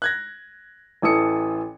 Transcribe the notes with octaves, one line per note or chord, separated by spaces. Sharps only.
F#6 G#6 A#6
A1 E3 A4 D#6 C#7